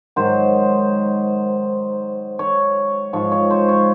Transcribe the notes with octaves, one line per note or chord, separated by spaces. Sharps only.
G#2 D#3 F#3 C5
C#5
G#2 F3 C#5
C#5
C5
C#5